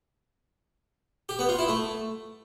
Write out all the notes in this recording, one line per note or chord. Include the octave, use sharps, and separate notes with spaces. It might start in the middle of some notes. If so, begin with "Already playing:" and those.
G4
B3
F4
E4
A3